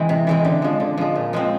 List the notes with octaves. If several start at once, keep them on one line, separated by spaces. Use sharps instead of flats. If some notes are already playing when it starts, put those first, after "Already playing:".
Already playing: E3 G#3 C4
C3
E3 G#3 C4
D3
F3 G#3
D3
F3 G#3
A#2
F3 G#3 C4